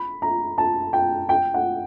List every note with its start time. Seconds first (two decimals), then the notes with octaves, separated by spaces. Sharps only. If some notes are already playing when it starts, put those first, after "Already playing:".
Already playing: B5
0.22 A#5
0.58 A5
0.93 G5
1.29 G5
1.54 F#5